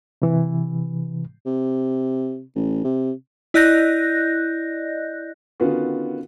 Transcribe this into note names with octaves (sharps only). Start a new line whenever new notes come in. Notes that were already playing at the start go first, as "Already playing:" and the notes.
C3 E3
C3
A1
C3
E4 D5 D#5 F#6 G6 A#6
D3 D#3 B3 C#4 F4 F#4